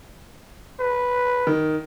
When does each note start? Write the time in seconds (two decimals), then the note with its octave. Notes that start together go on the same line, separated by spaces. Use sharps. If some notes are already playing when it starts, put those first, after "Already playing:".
0.80 B4
1.47 D#3